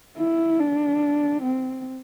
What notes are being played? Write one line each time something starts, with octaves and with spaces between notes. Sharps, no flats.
E4
D4
C4